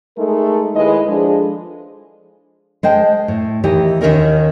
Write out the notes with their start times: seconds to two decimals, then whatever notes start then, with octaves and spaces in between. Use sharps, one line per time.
0.18 G#3 A3 D#4 A4 A#4
0.76 D#2 G#3 E4 B4 D#5
1.08 F3 G#3 D4 G#4 A4
2.83 G#3 C5 G5 A5
3.28 A2
3.64 D#2 E3 D#4 G4 D#5
4.01 D#2 D#3 C4 C#4 A#4 D#5